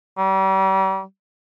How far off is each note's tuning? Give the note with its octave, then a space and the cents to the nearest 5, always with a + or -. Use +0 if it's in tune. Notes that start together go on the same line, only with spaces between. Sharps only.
G3 -35